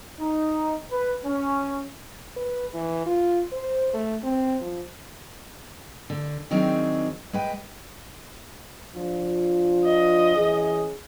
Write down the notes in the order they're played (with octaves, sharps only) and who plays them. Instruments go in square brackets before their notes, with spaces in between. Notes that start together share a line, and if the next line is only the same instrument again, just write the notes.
[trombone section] D#4
B4
C#4
[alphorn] B4
E3
F4
C5
A3
C4
F3
[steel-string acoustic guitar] D3
D#3 F#3 C4 D4 D#4 G#4
G#3 B4 G5
[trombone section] F3 D4 F4
[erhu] D#5
[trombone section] E3 C#4 G#4